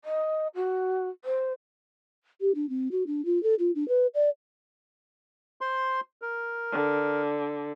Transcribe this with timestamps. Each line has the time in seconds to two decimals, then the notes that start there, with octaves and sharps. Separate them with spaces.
0.05 D#5
0.55 F#4
1.25 C5
2.41 G4
2.55 D4
2.69 C4
2.91 F#4
3.07 D4
3.25 F4
3.43 A4
3.59 F4
3.75 D4
3.88 B4
4.14 D5
5.61 C5 C6
6.22 A#4
6.72 D3